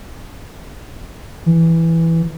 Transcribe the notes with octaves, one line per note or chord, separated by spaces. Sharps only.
E3